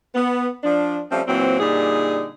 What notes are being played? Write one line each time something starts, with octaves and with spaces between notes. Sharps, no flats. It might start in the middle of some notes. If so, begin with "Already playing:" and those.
B3
F3 D4
F3 G3 A3 C4 C#4
A#2 E3 F#3 C4
A#2 D3 G3 D#4 G#4